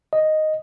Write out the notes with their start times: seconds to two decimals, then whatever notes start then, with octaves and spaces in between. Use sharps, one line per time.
0.13 D#5